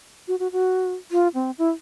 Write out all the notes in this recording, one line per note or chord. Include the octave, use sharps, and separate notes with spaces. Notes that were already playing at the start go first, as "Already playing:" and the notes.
F#4
F#4
F#4
F4
C4
E4